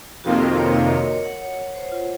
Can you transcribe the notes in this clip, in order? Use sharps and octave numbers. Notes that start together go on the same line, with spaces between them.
F2 C3 D#3 A#3 F4 F#4
A#4
C#5
D#5
C#5
D#5
C#5
F#5
C#5
C#5
C5
F4